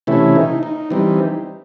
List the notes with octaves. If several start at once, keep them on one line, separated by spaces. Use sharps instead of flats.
C3 E3 A3 C#4 E4
D#4
D#4
E3 G3 C4 D#4